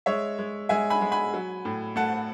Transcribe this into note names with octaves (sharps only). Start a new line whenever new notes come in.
G#3 C#5 E5
G#3
G#3 E5 G#5
G#5 B5
G#3
G#5 B5
F#3
A2
A3 F#5 A5